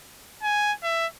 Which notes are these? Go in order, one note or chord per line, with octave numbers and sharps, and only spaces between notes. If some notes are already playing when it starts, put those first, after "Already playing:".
G#5
E5